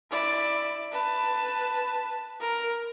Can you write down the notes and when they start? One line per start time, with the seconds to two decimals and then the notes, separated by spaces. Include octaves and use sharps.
0.11 E4 D5
0.92 B4 A5
2.40 A#4